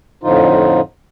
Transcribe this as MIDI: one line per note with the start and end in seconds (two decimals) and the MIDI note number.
0.24 0.81 41
0.24 0.81 45
0.24 0.81 50
0.24 0.81 53
0.24 0.81 63
0.24 0.81 65